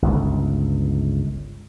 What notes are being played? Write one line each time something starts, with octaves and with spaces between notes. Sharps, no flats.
G1 C#2